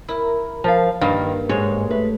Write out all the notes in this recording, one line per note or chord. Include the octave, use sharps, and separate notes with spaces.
E4 A#4
F3 A#4 F5 A5
G2 D#3 A#3 F5
G#2 G#3 C#5
A3 B4